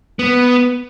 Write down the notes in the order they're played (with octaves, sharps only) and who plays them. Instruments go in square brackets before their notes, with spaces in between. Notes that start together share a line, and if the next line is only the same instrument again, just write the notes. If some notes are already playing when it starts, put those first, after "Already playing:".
[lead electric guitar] B3